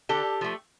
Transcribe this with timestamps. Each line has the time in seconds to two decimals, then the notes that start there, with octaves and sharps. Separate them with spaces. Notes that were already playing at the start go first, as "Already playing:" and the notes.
0.09 D3 G4 A4
0.41 F3 A3